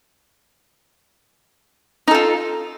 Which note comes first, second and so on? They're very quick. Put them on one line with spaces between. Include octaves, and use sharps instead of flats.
D#4 A4 F4